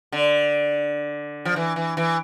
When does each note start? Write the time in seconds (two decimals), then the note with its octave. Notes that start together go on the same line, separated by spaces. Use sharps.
0.12 D3
1.45 F3
1.56 E3
1.76 E3
1.97 E3